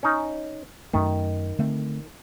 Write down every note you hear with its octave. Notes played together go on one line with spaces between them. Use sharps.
C#4 D#4
F#2 D#3 A3
D3 A3 C4